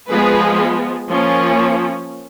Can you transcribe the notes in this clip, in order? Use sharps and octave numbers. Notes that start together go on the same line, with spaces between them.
F3 G#3 B3 G#4 B4
F3 A#3 C#4